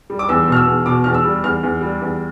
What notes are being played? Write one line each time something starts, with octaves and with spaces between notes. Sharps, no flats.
G3
D6
E2 E6
B2 F6
E6
E2
B2 D6
E2 F6
E6
G3
E2 F6
E2
G3
E2